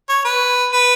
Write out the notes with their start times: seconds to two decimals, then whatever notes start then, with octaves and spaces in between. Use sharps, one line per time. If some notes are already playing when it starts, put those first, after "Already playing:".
0.09 C#5
0.25 B4
0.72 B4